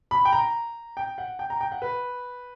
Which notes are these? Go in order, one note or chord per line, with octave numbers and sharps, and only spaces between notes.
B5
G5
A#5
G5
F#5
G5
A#5
G5
F#5
B4